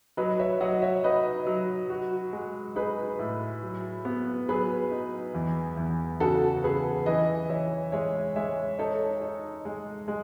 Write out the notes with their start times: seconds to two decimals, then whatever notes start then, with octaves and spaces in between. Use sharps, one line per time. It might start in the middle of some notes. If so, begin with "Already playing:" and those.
0.17 F#3 B4 D#5
0.39 C#5 E5
0.61 F#3 D#5 F#5
0.82 C#5 E5
1.04 D#4 B4 D#5
1.47 F#3
1.90 F#4
2.33 G#3
2.76 D#4 G#4 B4
3.19 A2
3.62 F#3
4.05 B3
4.48 F#3 G#4 B4
4.91 D#4
5.34 E2
5.77 E2
6.20 C#3 F#4 A4
6.64 C#3 G#4 B4
7.06 E3 B4 D#5
7.49 E3 C#5 E5
7.92 G#3 C#5 E5
8.36 G#3 C#5 E5
8.79 D#4 A4 C#5
9.22 D#4
9.65 G#3
10.08 G#3